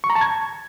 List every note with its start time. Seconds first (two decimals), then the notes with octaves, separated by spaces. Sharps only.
0.04 C#6
0.10 A#5
0.15 A5
0.21 G#6